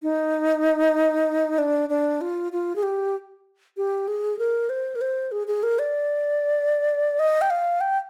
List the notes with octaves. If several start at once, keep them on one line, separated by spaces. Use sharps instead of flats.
D#4
D4
D4
F4
F4
G#4
G4
G4
G#4
A#4
C5
A#4
C5
G#4
G#4
A#4
D5
D#5
G5
F5
G5